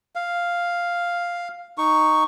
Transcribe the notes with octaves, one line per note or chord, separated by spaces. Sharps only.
F5
D#4 C#6